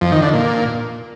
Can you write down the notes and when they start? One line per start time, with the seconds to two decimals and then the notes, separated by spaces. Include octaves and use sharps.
0.01 F2
0.12 D#3
0.22 D3
0.33 A#2